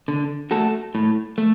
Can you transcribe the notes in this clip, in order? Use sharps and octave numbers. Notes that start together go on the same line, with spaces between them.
D3
A3 F#4 A4
A2
A3